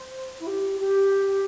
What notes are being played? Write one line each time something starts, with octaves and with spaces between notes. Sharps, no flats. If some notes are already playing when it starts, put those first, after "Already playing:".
Already playing: C5
E4
G4
G4